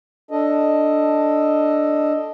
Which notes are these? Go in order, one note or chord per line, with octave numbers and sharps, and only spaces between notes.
D4 A4 D#5